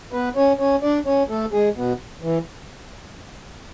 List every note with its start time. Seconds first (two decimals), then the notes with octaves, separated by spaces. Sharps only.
0.12 B3 B4
0.36 C#4 C#5
0.59 C#4 C#5
0.82 D4 D5
1.06 C#4 C#5
1.29 A3 A4
1.52 G#3 G#4
1.76 B2 B3
2.22 E3